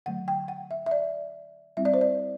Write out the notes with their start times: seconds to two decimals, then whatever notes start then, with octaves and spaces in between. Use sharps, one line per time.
0.06 D3 F#3 A3 F#5
0.28 G5
0.48 F#5
0.71 E5
0.86 E5
0.91 D5
1.77 G3 C4 E4 E5
1.85 D5
1.94 C5
2.01 D5